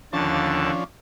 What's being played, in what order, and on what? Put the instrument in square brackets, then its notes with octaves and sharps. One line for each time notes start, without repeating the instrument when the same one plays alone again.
[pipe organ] D#2 D3 A5 [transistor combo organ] F3 C#4 D4